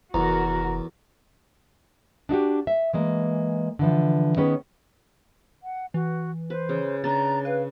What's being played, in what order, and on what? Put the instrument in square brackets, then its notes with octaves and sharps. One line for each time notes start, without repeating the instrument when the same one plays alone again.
[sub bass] F1 [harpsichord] E2 [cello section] F#4 A#4 [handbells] A#5
[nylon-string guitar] D4 D#4 F#4 G4
E5
E3 G#3 A#3
D3 E3 F3
D#3 B3 C#4 G#4 B4
[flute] F#5
[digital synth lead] E3 [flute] F#4
[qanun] B4 [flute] C5
[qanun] C#3
[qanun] C#3 D4 [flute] A#5 [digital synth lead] A6
[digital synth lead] B4 [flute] F5